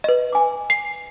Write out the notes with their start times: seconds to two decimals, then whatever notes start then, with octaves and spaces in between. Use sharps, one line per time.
0.04 B4 D#5
0.33 G#5 D6
0.70 C7